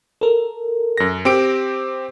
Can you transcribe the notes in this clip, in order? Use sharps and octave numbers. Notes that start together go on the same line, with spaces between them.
A4 A#4
F#2 A#6
C4 G4 D7